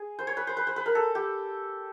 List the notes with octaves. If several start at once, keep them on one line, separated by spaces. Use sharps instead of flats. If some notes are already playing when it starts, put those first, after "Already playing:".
Already playing: G#4
C5
C#5
B4
C5
B4
C5
B4
A#4
A4
G4